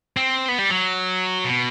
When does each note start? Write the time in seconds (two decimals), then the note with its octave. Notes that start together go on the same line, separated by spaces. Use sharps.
0.17 C4
0.48 B3
0.59 G3
0.70 F#3
1.45 B2